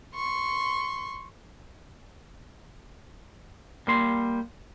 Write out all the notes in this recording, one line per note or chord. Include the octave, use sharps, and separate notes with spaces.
C6 C#6
G3 A#3 C6